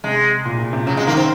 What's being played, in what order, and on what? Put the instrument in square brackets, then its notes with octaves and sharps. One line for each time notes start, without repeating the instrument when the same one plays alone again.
[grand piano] C3 [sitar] G#3
[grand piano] A#2
A#2
C3
[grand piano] C#3 [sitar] F#3
[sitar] G#3
[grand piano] D#3 [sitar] A#3
[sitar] C4